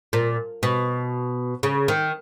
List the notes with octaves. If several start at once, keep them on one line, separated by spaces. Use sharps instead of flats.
A#2
B2
C#3
D#3